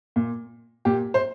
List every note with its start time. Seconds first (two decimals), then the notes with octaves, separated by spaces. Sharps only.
0.16 A#2
0.85 A#2 G4
1.14 C5